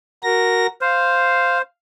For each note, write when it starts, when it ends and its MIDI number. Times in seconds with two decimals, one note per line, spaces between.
0.23 0.67 66
0.23 0.67 70
0.23 0.67 94
0.81 1.62 72
0.81 1.58 77